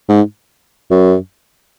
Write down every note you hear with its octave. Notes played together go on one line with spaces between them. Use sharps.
G#2
F#2